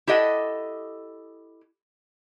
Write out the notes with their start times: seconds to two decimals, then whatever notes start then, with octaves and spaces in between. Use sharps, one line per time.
0.07 E4 G4 A4 D#5 F#5